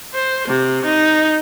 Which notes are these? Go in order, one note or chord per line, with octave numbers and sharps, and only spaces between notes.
C5
C3
D#4